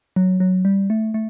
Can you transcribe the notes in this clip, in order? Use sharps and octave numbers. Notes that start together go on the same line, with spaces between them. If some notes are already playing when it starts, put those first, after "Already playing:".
F#3
F#3
G3
A3
A3